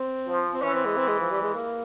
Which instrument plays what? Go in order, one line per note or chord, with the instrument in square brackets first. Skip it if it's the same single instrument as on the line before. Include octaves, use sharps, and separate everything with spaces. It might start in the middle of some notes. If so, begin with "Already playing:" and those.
Already playing: [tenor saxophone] C4
[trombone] F3
[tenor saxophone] C4
[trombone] E3 [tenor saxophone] C#4
[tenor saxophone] C4
G#3
C4
G#3
F3
G3
G#3
A#3